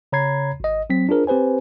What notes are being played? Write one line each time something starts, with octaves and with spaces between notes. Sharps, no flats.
C#3 C#5 A#5 B5 G#6 C7
G#1 D#5
F#3 C4 B6
D4 F4 G#4 A#4 C5
C4 G4 B4 C5 G#5